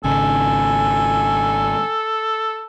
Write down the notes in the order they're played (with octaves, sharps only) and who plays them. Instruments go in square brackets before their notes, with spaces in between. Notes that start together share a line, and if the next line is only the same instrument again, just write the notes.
[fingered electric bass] G#1 C#3 [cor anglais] A4 [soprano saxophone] G#5